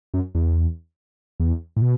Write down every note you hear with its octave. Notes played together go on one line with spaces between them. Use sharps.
F#2
E2
E2
A2
B2